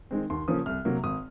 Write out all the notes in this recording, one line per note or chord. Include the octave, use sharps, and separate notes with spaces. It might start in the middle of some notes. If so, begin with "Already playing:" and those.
D#3 G#3 C4
D#2 C6
C#3 F3 A#3 C#4 D#6
C2 F6
C3 F#3 A#3
G#1 D#6